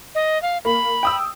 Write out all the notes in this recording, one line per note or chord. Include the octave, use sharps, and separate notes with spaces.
D#5
F5
A#3 B5
G5 D#6 E6